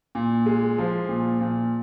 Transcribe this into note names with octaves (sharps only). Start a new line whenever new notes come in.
A#2
G#3
F3
A#2
A#2